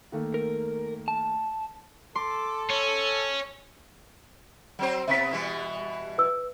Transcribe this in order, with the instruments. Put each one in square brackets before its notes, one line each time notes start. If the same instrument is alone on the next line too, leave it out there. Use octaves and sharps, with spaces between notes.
[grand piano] D#3 A3 A#3
[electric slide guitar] A#4
A5
[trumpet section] A4 [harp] C6 [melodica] D6
[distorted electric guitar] C#4 [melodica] C#5
[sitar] F#3 C4 C5
[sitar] C3 B3 [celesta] E5 B6
[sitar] B2 E3 G3
[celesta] B4 E6